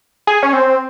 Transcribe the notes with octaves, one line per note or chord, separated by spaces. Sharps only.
G#4
C#4
C4